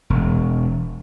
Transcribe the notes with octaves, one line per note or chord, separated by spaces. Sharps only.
E1